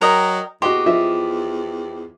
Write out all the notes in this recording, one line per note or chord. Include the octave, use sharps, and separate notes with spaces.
F#3 A#4 D#5 G5
E2 F#4 G4 D#5 C6
F3 D#5 E5